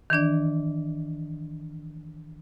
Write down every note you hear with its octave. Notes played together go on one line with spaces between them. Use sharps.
D#3 E3 D4 D5